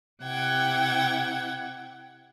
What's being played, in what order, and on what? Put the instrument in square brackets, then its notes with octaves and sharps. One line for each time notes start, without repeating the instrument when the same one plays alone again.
[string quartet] C3 E4 F#5 G5 G#6